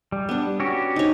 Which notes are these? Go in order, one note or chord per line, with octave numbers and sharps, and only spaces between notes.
G3
B3 D4
C#4 F#4 G4
D#4 C#5